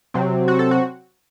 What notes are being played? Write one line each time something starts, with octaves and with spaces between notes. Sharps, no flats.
C3 F#3 C4
F#4
A4
F#4